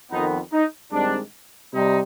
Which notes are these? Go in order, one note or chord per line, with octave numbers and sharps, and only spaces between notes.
F2 D#3 B3 D#4
D#4
G2 D#3 G#3 C4 D4
C3 G3 D#4